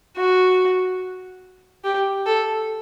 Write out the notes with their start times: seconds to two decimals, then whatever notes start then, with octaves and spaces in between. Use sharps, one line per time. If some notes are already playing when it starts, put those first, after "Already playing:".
0.16 F#4
1.84 G4
2.26 A4